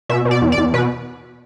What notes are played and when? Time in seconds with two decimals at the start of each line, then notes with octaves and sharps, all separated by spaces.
0.09 B2 E5
0.25 B2
0.31 D5
0.42 E2
0.52 D5
0.58 E2
0.74 B2 B4